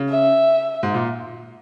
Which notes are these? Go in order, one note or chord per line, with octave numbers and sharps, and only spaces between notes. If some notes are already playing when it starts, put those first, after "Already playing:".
Already playing: C#3
E5
G#2
A#2